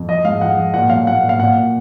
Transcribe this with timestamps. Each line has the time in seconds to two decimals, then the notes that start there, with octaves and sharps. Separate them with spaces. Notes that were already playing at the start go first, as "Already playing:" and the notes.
Already playing: F2
0.08 F3 D#5
0.24 G#2 F5
0.41 F3 F#5
0.58 F3
0.74 A#2 F#5
0.90 F#3 F5
1.07 A#2 F#5
1.23 A#2
1.29 F5
1.39 A#2 F#5
1.55 A#2